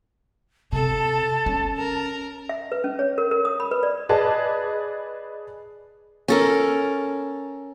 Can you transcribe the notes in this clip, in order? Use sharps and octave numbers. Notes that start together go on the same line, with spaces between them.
C3 A4 A5
C#4
A#4
E5
B4
C#4
C#5
A#4
A#4
D#6
B5
B4
D5
G#4 B4 D5 D#5 A5
C#4 A4 A#4